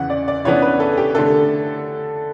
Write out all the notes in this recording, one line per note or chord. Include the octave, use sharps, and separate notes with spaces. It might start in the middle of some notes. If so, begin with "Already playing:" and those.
Already playing: E2 C#3 E3 F#5
D5
D5
C#3 E3 B3 D4 C#5
B4
A4
G4
D3 A3 D4 A4